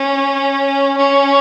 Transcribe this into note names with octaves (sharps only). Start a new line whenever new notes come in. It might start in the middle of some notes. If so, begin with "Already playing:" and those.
Already playing: C#4
C#4